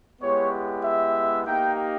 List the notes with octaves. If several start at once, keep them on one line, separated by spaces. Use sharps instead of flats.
G#3 B3 E4 G4 C#5
E5
A#3 D#4 G4 G5